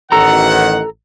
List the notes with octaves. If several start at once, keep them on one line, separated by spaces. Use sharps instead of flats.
A1 D#3 A4 F#5 A#5